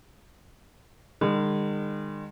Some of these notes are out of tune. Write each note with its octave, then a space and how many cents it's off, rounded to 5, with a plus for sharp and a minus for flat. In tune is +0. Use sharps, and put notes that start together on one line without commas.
D#3 -45 G#3 -45